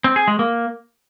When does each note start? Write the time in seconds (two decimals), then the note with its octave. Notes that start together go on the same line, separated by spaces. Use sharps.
0.04 C4
0.16 G#4
0.28 G#3
0.39 A#3